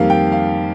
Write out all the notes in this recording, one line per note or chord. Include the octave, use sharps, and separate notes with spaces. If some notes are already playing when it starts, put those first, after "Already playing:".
Already playing: F2 D#3 G3 A#3 F5
G5
F5